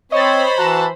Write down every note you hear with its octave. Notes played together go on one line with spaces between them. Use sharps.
C4 C5 C#5 D#5 B5 A6
E3 F#4 F#5 A5 A#5 E7